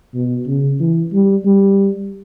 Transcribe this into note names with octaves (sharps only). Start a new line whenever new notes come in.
B2
C#3
E3
G3
G3